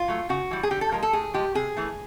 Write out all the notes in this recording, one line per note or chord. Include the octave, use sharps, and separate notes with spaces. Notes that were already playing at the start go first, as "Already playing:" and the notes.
Already playing: F4
F#3 A3
C#3 F#4
E3 G3
G#4
D3 G4
A4
F3 G#3 A#4
A4
A2 G#4
F3 G#3 G4
C3 G#4
E3 A3